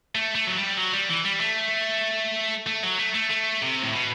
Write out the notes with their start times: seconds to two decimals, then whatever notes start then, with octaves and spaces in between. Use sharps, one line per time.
0.15 A3
0.35 A3
0.47 F#3
0.57 G3
0.77 F#3
0.94 G3
1.10 E3
1.25 G3
1.41 A3
2.67 A3
2.83 F#3
2.98 A3
3.14 A3
3.30 A3
3.62 C3
3.82 A2
3.94 B2